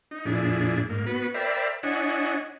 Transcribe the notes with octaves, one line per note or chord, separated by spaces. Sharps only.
D#4
F2 A#2 D4 E4 G#4
G#2 A#3
B3 F#4 B4
A#4 C5 D5 E5 G5 B5
D4 E4 C#5 D#5 F#5 G#5